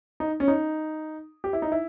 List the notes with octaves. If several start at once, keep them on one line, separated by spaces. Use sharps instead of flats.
D#4
C#4
D#4
G4
E4
D#4
E4